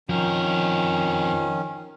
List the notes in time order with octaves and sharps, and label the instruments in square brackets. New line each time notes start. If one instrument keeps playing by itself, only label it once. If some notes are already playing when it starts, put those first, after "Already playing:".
[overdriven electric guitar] F2 A#4 [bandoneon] D#3 C#4 [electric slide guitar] F3